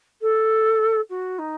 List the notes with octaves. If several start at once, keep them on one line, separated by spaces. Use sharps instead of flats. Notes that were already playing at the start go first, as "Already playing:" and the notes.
A4
F#4
D#4